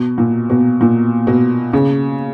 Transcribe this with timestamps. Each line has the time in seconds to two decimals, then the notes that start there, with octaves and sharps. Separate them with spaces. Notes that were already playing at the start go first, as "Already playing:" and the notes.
Already playing: B2
0.18 A#2
0.50 B2
0.81 A#2
1.27 B2
1.73 C#3